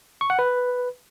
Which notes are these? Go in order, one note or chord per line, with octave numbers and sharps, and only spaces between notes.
C#6
F#5
B4